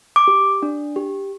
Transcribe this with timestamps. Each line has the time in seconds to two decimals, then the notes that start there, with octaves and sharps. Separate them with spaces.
0.16 D6
0.28 G4
0.63 D4
0.96 G4